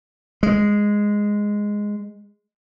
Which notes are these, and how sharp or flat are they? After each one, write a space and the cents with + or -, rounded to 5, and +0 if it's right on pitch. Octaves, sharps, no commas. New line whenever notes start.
G#3 -5